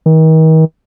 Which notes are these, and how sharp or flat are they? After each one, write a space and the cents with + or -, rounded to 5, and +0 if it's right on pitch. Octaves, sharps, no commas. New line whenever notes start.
D#3 +40